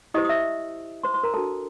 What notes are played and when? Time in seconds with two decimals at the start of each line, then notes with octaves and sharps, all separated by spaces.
0.14 E4 G4 C5 D#5 D#6
0.25 D#6
0.29 E5 E6
1.03 C5 C6
1.14 C5 C6
1.23 A#4 A#5
1.34 D4 F#4 A4 C5 A5